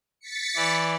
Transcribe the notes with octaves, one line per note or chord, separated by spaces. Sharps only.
A6 B6 C#7
E3 D5